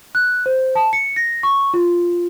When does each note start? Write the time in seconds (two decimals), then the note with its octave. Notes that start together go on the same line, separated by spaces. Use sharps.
0.15 F#6
0.46 C5
0.75 A5
0.93 C#7
1.16 A#6
1.43 C#6
1.74 F4